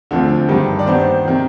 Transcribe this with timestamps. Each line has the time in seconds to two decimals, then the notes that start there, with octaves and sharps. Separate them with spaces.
0.11 D2 D3 F3 C4
0.48 G2 D#3 G3
0.79 D5
0.86 D#2 D#3 B3 C5
1.25 C3 D#3